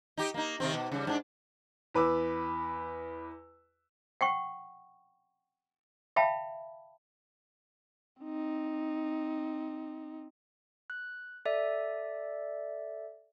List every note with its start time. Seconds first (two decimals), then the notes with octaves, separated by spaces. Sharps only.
0.17 D#4 G4
0.34 A#3 D#4
0.60 C3 D#3 C4
0.74 B2
0.92 C#3 G3
1.07 G#2 D4
1.95 E2 B4 D6 E6
4.21 F#5 G5 C#6
6.16 E5 F5 G5 A5 B5
8.22 C4 D#4
10.90 F#6
11.45 A4 D5 E5